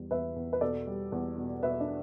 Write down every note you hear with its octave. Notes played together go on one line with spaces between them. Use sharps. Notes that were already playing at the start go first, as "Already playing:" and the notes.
Already playing: E2 G3
E2 B4 E5
E2
B4
B2 A4 D5
G3
E2
B2
B2 B4 E5
D4